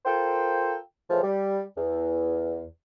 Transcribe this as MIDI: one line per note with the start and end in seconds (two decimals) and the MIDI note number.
0.05 0.75 65
0.05 0.75 69
0.05 0.75 70
0.05 0.75 72
0.05 0.75 79
1.10 1.22 45
1.10 1.22 49
1.10 1.22 52
1.10 1.22 53
1.23 1.60 55
1.77 2.64 40